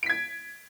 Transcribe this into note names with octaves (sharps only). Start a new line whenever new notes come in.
G#6 B6 D7